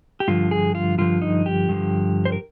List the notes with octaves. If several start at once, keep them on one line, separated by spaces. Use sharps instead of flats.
G4
G2 D3 F3 F4
G#4
F4
G2 D3 F3 F4
D#4
G4
G2 D3 F3
C5
A#4